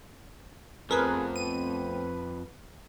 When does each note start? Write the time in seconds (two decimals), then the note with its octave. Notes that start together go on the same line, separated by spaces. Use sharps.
0.91 F2 F3 A3 B3 C4 G#4 A#4 B4
1.36 B4 D#7